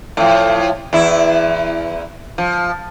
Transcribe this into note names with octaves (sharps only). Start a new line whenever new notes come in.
A2 F3
E2 E4
F3